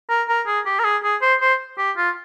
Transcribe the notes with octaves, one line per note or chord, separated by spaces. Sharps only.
A#4
A#4
G#4
G4
A#4
G#4
G#4
C5
C5
G4
F4